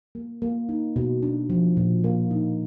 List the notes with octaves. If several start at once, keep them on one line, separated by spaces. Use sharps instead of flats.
A#3
A#3
D#4
B2
D4
F3
A#2
A#3
D#4